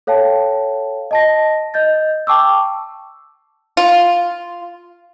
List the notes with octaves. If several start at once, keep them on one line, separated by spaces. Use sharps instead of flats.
A4 C#5 F5 G5 A5
D#5 A5 A#6
D#5 G6 A6
G5 A5 C#6 D6 E6
F4